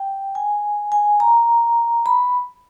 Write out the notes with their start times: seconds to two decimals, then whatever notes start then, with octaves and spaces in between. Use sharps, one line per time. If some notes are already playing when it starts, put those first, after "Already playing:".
Already playing: G5
0.35 G#5
0.92 G#5
1.20 A#5
2.06 B5